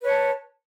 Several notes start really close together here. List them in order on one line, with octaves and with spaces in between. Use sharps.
B4 C#5 A5